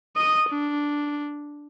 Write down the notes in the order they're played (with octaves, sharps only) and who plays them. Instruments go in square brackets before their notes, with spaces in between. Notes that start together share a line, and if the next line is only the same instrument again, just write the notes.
[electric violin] D#5 D#6
D4